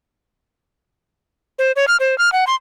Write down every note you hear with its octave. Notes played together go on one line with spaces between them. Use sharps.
C5
C#5
F6
C5
F6
F#5
C6